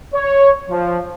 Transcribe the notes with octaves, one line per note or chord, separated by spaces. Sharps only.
C#5
F3